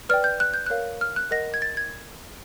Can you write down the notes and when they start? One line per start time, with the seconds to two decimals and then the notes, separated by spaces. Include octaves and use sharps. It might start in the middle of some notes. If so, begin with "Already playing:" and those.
0.09 B4 D5 G5 F6
0.24 G6
0.40 F#6
0.54 G6
0.66 A#4 C#5 F5 F#6
1.01 F6
1.16 F#6
1.31 A#4 D#5 F#5 A#6
1.54 G#6
1.62 A6
1.77 G#6